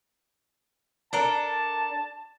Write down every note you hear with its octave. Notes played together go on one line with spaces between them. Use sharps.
D4 A4 A#4 A5